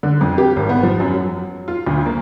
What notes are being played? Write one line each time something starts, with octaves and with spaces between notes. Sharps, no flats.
D3
F2
G4
G#1
B3
F3
F#2
F#3
F4
D2
A#3